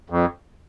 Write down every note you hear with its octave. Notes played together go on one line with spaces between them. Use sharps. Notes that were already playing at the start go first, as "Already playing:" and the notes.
F2